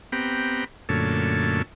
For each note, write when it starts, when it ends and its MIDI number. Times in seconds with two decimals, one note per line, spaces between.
0.12 0.64 59
0.12 0.64 60
0.12 0.64 67
0.12 0.64 79
0.12 0.64 82
0.12 0.64 83
0.89 1.62 42
0.89 1.62 46
0.89 1.62 50
0.89 1.62 57
0.89 1.62 73
0.89 1.62 81